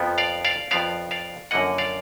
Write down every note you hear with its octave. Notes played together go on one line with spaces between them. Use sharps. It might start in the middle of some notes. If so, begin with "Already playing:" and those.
Already playing: F2 F3 B3
D5 F5
D5 F5
F2 F3 B3 D5 F5
D5 F5
F#2 D3 F3 A#3 D#5 F#5
D5 F5